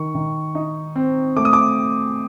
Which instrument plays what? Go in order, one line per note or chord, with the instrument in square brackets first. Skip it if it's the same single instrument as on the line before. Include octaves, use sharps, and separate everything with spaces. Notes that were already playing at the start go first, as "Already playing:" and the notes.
Already playing: [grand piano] D#3 C#6
D#3
D#4
C4
A3 D6
D#6
D6